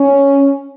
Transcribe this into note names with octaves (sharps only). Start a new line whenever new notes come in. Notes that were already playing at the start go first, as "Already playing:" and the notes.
Already playing: C#4